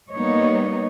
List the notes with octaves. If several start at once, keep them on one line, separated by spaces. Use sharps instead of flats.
G3 A#3 B3 D#4 C#5 D#5